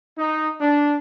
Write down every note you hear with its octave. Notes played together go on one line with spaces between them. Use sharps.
D#4
D4